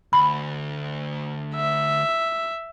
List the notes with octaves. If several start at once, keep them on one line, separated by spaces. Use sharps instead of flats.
D2 B5
E5